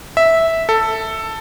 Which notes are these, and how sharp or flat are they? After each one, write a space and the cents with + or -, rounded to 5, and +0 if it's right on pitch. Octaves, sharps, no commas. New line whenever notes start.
E5 -10
A4 +10